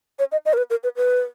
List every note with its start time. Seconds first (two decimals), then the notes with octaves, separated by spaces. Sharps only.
0.19 C#5
0.32 D#5
0.45 D#5
0.53 A#4
0.57 B4
0.70 A#4
0.83 B4
0.96 B4